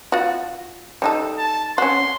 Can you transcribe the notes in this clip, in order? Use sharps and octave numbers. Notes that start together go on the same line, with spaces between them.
F4 F#4
G3 D#4 A4
A5
C#4 F#4 C6